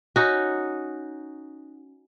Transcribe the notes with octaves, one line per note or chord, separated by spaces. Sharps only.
C#4 D#4 F#4